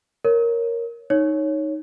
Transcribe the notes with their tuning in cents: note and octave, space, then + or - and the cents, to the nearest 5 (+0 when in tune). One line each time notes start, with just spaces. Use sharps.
A#4 +0 C#5 +0
D#4 +0 C#5 +0